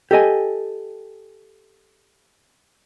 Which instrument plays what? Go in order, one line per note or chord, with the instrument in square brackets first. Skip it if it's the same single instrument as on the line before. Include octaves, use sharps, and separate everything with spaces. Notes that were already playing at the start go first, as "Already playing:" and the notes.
[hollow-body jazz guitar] G4 A4 D#5 G#5